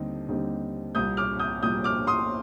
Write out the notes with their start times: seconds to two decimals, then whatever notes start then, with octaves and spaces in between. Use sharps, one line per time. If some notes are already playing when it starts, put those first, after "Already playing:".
Already playing: D#2 D3 G3 C4 D#4
0.28 D#2 D3 G3 C4 D#4
0.95 C2 A#2 G3 D#6 G6
1.17 D6 F6
1.39 D#6 G6
1.63 C2 A#2 G3 D#6 G6
1.84 D6 F6
2.07 C6 D#6